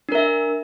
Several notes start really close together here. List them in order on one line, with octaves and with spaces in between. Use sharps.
D4 A#4 E5